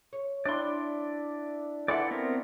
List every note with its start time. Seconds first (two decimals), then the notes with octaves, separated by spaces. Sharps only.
0.13 C#5
0.45 D4 E4 D5 C6
1.88 E3 E4 F4 A4 D5 F#5 C6
2.11 B3 C4 A#4